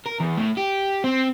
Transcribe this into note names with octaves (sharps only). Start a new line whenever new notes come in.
A#4
E2
A2
G4
C4